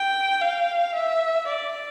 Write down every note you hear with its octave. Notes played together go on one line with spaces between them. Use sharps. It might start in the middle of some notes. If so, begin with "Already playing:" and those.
Already playing: G5
F5
E5
D5